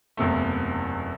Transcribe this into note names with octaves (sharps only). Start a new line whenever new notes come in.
F#1 E2 C3 A3